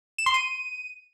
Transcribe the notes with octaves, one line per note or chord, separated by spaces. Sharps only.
E7
C6
D#7